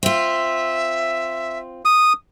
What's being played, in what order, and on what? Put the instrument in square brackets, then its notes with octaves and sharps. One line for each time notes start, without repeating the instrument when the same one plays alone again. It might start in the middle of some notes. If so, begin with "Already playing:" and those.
[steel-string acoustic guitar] C4 F4 [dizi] E5
[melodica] D#6